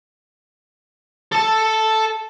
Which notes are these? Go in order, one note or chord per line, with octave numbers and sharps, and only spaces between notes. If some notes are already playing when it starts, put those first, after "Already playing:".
A4 A5